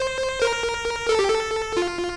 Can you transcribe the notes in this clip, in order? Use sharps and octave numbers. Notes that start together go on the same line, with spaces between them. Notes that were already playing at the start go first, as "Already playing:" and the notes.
Already playing: C5
A#4
A4
G4
A4
F4